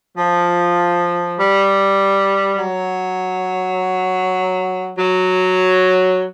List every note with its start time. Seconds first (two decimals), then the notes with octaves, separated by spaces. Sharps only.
0.17 F3
1.37 G3
2.57 F#3
4.97 F#3